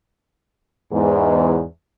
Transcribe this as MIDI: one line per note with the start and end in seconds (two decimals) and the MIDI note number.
0.92 1.61 40
0.92 1.61 44